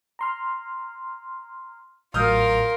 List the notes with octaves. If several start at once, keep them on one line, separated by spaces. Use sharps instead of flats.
A#5 C6 F6
A1 A2 F#3 F4 A#4 D#6 F6 G6